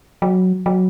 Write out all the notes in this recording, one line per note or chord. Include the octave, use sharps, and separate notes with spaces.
F#3
F#3